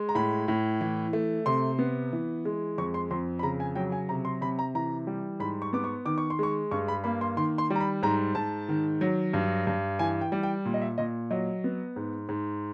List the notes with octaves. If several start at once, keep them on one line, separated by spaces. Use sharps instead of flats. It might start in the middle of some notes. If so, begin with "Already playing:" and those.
Already playing: G#3
A#5
A2 B5
A2
E3
A3
C3 C6
B3
E3
G#3
F2 C#6
C6
F2 C6
B5
C#3 A#5
G#5
F#3 G5
G#5
C3 A#5
C6
C3 B5
A#5
E3 A#5
G3
G#2 B5
C#6
B3 D6
C#6
D#3 D6
C#6
C6
G#3 C#6
G2 C#6
B5
A#3 B5
C6
D#3 C6
C6
G3
A#5
B5
G#2 A#5
G#2 A5
D#3
F#3
G2
G2
E3 G#5
G5
G3
G5
A#2
D#5
E5
A#2 D#5
F#3 D#5
B3
G#2
G#2